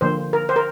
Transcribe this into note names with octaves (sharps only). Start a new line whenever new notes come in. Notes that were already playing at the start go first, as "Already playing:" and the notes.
D3 F3 A#3 C5
A#4
C5
A#4